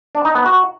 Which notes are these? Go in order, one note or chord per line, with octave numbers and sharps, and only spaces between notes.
D4
D#4
B3
F#4